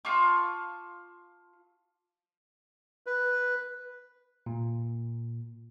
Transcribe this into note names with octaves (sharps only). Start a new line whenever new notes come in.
F4 A5 C#6 D6
B4
A#2